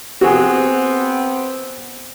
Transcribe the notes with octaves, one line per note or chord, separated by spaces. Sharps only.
B3 C4 F#4 G#4